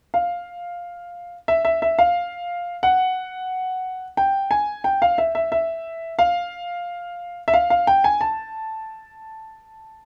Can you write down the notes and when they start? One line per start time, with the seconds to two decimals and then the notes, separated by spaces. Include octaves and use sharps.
0.14 F5
1.48 E5
1.65 E5
1.82 E5
1.99 F5
2.83 F#5
4.17 G5
4.51 G#5
4.84 G5
5.02 F5
5.18 E5
5.35 E5
5.52 E5
6.19 F5
7.48 E5
7.54 F5
7.70 F5
7.87 G5
8.04 G#5
8.21 A5